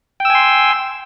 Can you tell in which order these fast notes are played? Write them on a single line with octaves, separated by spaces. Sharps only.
G5 E6 G#5 C6